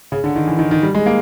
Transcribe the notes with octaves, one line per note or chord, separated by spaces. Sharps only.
C#3
D3
D#3
E3
D#3
D#3
G3
G#3
A#3